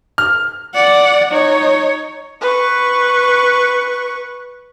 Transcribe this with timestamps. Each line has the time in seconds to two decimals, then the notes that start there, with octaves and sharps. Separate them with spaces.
0.18 F6
0.74 D5 F#5
1.31 D#4 C#5
2.41 B4 C#6